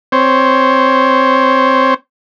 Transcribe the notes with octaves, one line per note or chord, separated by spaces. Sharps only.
C4 C5 C#5